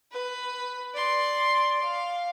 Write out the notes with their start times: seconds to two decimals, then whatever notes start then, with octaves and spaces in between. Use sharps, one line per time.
0.12 B4
0.95 D5 C6
1.83 F5